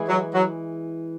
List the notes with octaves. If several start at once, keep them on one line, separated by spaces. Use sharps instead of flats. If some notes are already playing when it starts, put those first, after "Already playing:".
Already playing: E3 G#3 E4 G#4
F#3
F#3